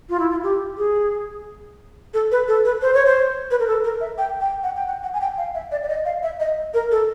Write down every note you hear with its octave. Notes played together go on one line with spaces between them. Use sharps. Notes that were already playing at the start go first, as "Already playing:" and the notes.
F4
E4
F4
G4
G#4
A4
B4
A4
B4
C5
C#5
C5
B4
A#4
A4
A#4
E5
G5
G5
F#5
G5
F#5
F#5
G#5
G5
F5
E5
D5
D5
D#5
F5
E5
D#5
A#4
A4